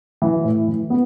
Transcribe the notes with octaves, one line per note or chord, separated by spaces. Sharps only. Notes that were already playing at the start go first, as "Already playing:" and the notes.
E3
A2
E3
B3